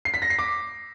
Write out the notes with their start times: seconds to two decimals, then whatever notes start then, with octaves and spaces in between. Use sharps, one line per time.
0.05 C7
0.14 B6
0.22 A#6
0.30 C7
0.39 D6